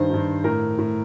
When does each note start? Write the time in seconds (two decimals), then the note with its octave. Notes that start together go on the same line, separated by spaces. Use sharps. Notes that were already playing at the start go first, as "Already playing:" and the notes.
Already playing: G2 D#3 C5
0.10 G2 D#3
0.44 A2 A#4
0.78 A2